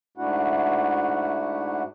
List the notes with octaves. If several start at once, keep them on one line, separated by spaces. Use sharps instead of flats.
G#2 A3 D4 E4 F#4 F#5